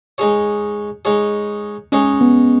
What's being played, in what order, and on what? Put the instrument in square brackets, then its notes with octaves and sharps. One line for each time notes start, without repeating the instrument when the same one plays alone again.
[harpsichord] G#3 D#4 G#4 C#5
G#3 D#4 G#4 C#5
[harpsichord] G#3 D#4 G#4 C#5 [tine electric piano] C#4
[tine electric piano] B3